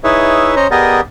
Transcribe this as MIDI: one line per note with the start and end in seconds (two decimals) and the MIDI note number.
0.04 0.55 63
0.04 0.55 64
0.04 0.55 68
0.04 0.55 71
0.04 0.55 73
0.04 0.55 76
0.56 0.67 61
0.56 0.67 72
0.56 0.67 73
0.56 0.67 75
0.56 0.67 82
0.71 1.01 59
0.71 1.01 67
0.71 1.01 68
0.71 1.01 70
0.71 1.01 74
0.71 1.01 75